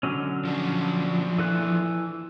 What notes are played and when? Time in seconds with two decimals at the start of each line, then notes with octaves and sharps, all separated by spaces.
0.03 D3 F#3 C#4
0.45 F3 D4
1.39 E3 A4 F#6